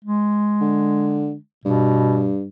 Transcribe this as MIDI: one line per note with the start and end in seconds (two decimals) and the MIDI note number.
0.04 1.40 56
0.61 1.34 50
1.65 2.47 43
1.65 2.35 47